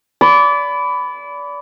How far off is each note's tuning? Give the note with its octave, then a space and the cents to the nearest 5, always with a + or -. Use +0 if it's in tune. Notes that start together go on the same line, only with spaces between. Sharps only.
D5 -30 B5 +15